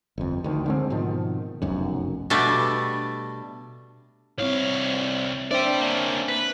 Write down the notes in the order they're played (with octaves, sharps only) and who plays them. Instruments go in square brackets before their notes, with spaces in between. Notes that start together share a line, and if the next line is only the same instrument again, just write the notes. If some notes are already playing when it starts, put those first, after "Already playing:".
[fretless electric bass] G1 F2
D2 D#3
D3 G#3 C4
G#2 B2 D#3 F3
F1 B1 F#2
[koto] B2 G3 A3 D4
[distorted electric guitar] C2 F5 [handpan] C4 E4 C#5
[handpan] D4 C5 E5 [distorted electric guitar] D5 G5
[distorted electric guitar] A#3 C#4
B4